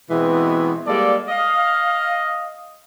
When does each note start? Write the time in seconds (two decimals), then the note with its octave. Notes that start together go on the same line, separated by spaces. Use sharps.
0.10 B2 E3 G#3 B3 C4
0.87 G3 G#3 A#3 A4 D5
1.29 D#5 F5